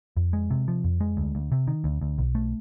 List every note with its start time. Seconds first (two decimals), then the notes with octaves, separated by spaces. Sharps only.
0.17 F2
0.33 G#3
0.50 C3
0.68 F3
0.84 F2
1.00 G#3
1.17 D2
1.35 D2
1.52 C3
1.67 D#3
1.84 D2
2.01 D2
2.18 B1
2.35 A3